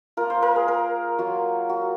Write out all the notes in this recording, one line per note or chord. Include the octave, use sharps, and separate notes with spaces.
A#3 F4 A#4
C5
A#4
G#4
A#4
F#3 A#3 F4 F#4
F#4